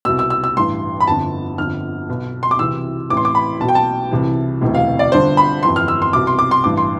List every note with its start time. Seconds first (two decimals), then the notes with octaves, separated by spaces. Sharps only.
0.05 C2 B2 E6
0.19 E6
0.30 E6
0.44 E6
0.56 A1 G2 E3 C6
1.00 B5
1.07 G1 F2 D3 A5
1.58 G1 F2 D3 F6
2.09 B1 B2
2.43 C6
2.51 D6
2.59 C2 C3 E3 E6
3.10 A1 A2 E3 D6
3.17 C6
3.25 D6
3.35 B5
3.60 B1 B2 A5
3.69 G5
3.75 A5
4.11 C2 C3 E3
4.61 E1 D2 C3 E3
4.75 F5
4.99 D5
5.12 G1 G2 D3 C5
5.37 B5
5.63 G1 F2 E3 C6
5.76 F6
5.88 E6
6.02 C6
6.13 C2 B2 D6
6.27 C6
6.39 D6
6.51 C6
6.64 A1 G2 E3 D6
6.77 C6